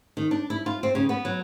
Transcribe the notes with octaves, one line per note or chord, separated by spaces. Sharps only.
D#3
D4
E4
F4
C4
C#3
B3
F#3